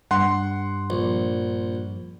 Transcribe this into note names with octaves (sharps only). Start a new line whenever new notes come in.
G2 F#5 C6
A#1